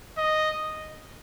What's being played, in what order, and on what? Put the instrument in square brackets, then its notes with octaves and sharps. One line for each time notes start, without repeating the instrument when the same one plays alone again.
[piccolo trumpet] D#5